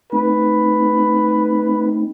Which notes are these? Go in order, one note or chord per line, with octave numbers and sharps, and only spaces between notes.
A3 C4 D#4 B4